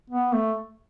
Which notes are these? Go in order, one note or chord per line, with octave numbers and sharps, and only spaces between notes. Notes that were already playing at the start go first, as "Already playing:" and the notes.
B3
A3